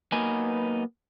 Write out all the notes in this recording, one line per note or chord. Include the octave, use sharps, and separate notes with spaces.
F#3 A#3 B3 D#4 B4 G#5